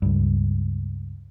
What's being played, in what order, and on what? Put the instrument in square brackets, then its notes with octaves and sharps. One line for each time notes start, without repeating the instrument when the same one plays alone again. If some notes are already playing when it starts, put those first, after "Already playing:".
[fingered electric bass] C#2 G2